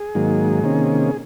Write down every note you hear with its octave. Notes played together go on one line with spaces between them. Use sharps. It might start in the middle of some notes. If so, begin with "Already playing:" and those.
Already playing: G#4
G#2 D#3 F#3 A#3
C3 D#3 A#3 C#4